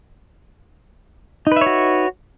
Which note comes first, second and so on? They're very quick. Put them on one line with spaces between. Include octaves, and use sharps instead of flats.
D#4 B4 E5 C#5 F#4